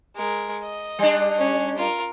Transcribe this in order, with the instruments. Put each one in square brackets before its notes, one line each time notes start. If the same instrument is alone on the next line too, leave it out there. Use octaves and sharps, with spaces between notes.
[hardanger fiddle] G#3 A#4
D#5
[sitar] G3 D4
[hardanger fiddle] C#4
F4 A#4